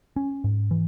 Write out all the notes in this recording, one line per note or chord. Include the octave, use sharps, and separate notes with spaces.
C#4
G#2
E3